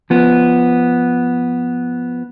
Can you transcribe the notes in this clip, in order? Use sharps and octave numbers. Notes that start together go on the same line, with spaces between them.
F3 B3